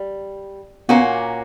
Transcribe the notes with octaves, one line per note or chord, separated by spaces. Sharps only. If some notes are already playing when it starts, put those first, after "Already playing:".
Already playing: G3
A#2 A#3 B3 C#4 F#4